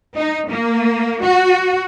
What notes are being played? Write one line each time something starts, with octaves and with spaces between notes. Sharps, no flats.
D#4
A#3
F#4